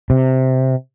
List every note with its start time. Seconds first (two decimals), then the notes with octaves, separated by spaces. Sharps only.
0.10 C3